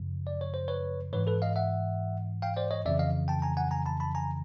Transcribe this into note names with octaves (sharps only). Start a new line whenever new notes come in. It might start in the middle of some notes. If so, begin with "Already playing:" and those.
Already playing: F#2 C#3 F3
D5
C#5
C5
B4 C#5
G#2 E3 B4 C#5
A4 B4
D#5 F5
E5 F#5
F5 G5
C5 D5
C#5 D#5
F2 C#3 E3 D5 E5
D#5 F5
G5 A5
G#5 A#5
F#5 G#5
G#5 A#5
A5 B5
A5 B5
G#5 A#5